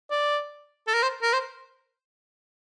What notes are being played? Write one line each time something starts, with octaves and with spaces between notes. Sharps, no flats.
D5
A4
A#4
C5
A#4
C5